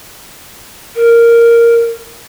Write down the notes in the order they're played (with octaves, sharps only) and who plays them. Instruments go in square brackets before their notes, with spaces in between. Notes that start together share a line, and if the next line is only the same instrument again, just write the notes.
[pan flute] A#4